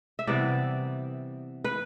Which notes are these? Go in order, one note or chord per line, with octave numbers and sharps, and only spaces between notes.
E5
C3 E3 G3 B3 D5
B4